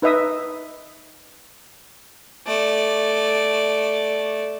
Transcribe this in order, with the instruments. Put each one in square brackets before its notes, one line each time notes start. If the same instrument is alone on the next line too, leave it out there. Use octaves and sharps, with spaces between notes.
[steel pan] D#4 B4 D#5 E5 D#6
[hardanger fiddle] A3 D5